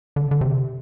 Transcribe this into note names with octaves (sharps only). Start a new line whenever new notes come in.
D3
D3
C3